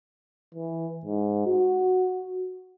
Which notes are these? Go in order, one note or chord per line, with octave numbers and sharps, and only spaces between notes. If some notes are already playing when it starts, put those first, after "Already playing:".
E3
G#2
F#4